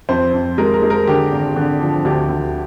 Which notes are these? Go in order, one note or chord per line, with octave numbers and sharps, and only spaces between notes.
F2 C5
F2
G#3 A#4
A#4
G#3
A#4
D3 G4
G#1
D3
F3
D2 G4
D2